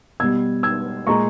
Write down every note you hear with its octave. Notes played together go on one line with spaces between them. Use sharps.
B2 G3 E6 G#6
E6 G#6
A#2 G#3 A#5 C#6